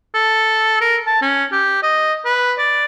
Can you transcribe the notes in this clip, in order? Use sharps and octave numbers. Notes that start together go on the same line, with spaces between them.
A4
A#4
A5
C#4
G4
D#5
B4
D5